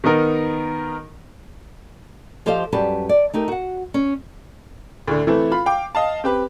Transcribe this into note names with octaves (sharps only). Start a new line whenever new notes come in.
D#3 B3 D#4 A#4
F3 G4 A4 C5 D#5 F5
F#2 G3 G4 B4 A5
D5
A3 D#4 G4 A#4
F#4 F#5
C#4
D2 A2 D3
E3 A3 C4 E4 A4 B4
F4 B5
F5 G5 D6
D#5 F5 A5
C4 G4 B4